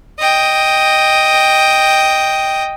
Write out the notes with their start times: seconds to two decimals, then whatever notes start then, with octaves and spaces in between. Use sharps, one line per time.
0.20 D#5 G5